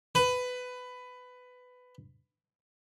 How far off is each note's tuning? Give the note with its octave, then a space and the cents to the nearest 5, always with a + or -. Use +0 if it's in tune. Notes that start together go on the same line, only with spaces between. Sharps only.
B4 +15